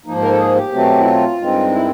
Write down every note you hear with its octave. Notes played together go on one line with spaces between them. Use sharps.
G#2 F3 A#3 D#4
A#4
A4
G#4
G4
B2 F#3 A3 C4
E4
F4
G2 D#3 G#3 C4
E4